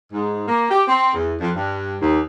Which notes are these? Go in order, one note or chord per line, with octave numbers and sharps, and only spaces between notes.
G#2
A#3
G4
C4
E2
F2
G2
D#2